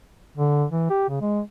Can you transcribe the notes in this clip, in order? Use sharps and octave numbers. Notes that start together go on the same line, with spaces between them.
D3
E3
G4
C#3
G#3